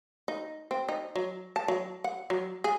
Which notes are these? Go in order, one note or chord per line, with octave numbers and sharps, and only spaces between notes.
D#4
C4
D#4
F#3
A5
F#3
F#5
F#3
G#4